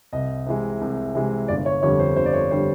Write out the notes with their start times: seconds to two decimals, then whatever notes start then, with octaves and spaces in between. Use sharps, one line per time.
0.13 C2 D#5
0.47 C3 E3 G#3
0.81 C2
1.15 C3 E3 G#3
1.48 G1 D5
1.66 C#5
1.83 F2 D3 G3 C#5
1.99 C5
2.16 G1 C5
2.26 D5
2.33 C#5
2.51 D3 G3 C5